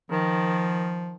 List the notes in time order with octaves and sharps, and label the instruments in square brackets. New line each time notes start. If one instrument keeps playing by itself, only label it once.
[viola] D#3 [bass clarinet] F3